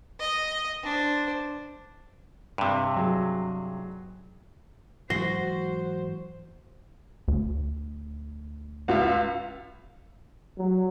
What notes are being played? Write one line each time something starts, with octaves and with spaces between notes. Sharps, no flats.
D#5
D4 C5
G2 C3
F#3 G#4
G#2 E3 F#3 F#4 C5 A#6 C7 G7
D2
C#2 F4 E5
F#3